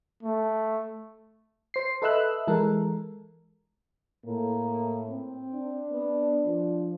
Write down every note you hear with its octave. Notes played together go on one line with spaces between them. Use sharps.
A3
C5 C7
A4 B4 D#5 E5 E6 F#6
E3 G#3 A4 A#4
A2 A#3
C4
D4
B3
F3